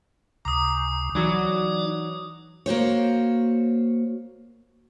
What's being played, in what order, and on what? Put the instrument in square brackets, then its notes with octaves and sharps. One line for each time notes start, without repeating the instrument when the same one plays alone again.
[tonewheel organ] C#2 C3 [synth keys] A#5 [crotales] D6 D#6
[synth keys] E3 F#3 F#4 [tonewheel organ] D#4 D5
[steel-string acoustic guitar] A#3 F#4 C5 C#5